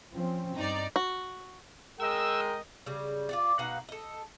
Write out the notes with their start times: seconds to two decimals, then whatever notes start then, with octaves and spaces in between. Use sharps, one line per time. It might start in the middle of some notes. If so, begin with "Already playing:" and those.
0.13 F3 C4 C#4
0.57 G2 D#4 D5
0.96 F#4
2.00 G#3 A#4 D#5 G5 E6
2.86 C#3 G3
3.29 F4 F#4 D5
3.59 B2 D#4 F#4 F5
3.89 A4 D#5